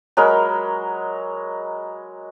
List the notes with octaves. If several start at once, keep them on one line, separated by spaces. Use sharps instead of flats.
F#3 G#3 A#4 B5